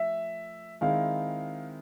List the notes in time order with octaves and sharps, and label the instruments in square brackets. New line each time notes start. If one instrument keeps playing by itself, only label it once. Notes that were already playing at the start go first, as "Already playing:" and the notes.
Already playing: [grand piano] F3 A3 [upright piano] E5
[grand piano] D#3 G#3 C4 E4 [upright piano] F5